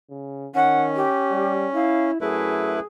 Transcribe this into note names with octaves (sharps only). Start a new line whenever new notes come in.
C#3
D#3 C#4 F#5
G4
G3
E4 F5
F#2 A3 E4 G#4 B4